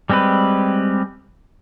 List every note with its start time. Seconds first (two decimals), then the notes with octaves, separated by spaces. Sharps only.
0.10 G3 G#3 C4 G4 B4